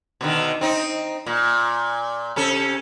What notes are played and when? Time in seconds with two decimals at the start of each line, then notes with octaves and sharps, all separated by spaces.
0.21 B2 D3 D#3
0.61 C4 D#4
1.26 A#2
2.36 C3 C#4 A4